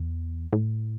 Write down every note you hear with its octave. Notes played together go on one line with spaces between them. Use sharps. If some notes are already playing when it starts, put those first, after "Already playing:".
Already playing: E2
A2